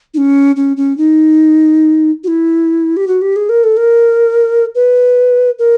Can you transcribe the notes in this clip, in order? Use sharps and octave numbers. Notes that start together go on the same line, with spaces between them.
D#4
C#4
C#4
C#4
D#4
F#4
E4
G4
F#4
G4
G#4
A#4
A4
A#4
B4
A#4